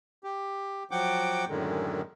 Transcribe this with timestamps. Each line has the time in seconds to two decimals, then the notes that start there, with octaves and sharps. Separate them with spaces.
0.24 G4
0.91 F3 F#3 F#5 G5 D6
1.48 F#2 A2 D3 D#3 G#3